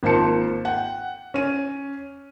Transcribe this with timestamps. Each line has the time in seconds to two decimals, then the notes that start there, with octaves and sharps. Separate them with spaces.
0.03 G#1 A#3 F4 C5 A5 C#7
0.65 F#5 G5
1.34 C#4 D#7